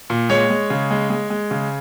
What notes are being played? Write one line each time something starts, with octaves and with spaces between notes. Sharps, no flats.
A#2
G#3 C#5
G#3
C#3
G#3
G#3
G#3
C#3